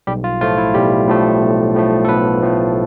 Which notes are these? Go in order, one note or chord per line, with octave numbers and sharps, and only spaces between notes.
B1 G3 G4
F4
A2 F3 A3 F4
E4
B1 G3 G4
A2 F3 A3
B1
A2 F3 A3
A4
B1 B3 B4
A2 F3 A3